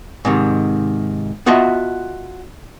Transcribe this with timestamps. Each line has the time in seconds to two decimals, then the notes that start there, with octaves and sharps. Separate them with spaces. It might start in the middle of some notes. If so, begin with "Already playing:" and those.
0.25 G#2 C3 D#3
1.46 B3 F4 F#4 D#5 E5 A5